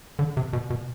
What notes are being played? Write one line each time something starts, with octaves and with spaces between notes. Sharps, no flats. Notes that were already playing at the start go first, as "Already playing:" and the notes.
D3
C3
B2
B2